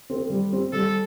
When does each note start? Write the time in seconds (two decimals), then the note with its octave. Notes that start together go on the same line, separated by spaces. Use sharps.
0.10 C4 A4 C5
0.30 G3
0.52 C4 G4
0.73 G3 A4